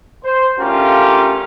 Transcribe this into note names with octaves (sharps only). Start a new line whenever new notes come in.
C5
D3 A3 C#4 F4 G4 A#4